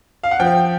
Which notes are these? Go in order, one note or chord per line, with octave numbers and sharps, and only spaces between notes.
F5
F#5
F3 G5